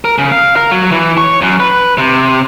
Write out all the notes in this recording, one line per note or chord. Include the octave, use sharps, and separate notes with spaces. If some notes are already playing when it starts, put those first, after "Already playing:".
A#4
C#3
F5
A#4
F#3
E3
C#5
F#2
B4
C3